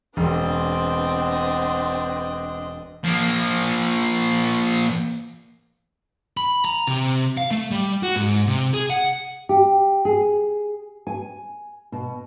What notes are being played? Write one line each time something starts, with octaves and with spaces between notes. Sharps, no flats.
E1 B3 C4 D4 D#5
F3 A#3
B5
A#5
C3
F5
A3
G3
F#4
G#2
C3
G#4
F#5
G4
G#4
G#5
B2